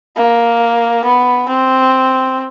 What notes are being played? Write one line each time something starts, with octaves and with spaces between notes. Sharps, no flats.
A#3
B3
C4